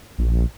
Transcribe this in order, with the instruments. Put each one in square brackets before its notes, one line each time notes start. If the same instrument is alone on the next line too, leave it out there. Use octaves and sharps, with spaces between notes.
[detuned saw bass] A#1